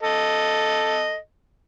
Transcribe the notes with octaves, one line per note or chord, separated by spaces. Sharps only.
A4 D#5